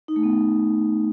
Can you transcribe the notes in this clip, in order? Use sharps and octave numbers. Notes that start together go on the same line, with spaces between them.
D#4
A3
B3